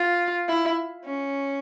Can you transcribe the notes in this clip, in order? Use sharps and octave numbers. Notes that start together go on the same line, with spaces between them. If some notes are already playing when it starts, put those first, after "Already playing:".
Already playing: F4
E4
C#4